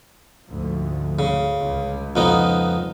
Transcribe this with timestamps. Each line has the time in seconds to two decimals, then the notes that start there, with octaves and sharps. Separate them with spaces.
0.47 D2 G#2 F3
1.19 C#3
1.58 C#2
2.16 F2 B3 D#4